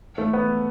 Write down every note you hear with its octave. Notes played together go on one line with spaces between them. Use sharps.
A3
B3